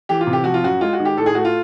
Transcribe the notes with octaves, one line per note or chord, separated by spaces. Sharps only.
E3 G4
F4
C3
G4
F3 F#4
F4
F#2 F#4
G#3 F4
F#4
D#3
G4
A2 A4
G#4
A3 F#4
F4